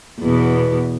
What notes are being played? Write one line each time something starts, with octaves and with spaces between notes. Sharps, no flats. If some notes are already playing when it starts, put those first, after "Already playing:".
E2 B2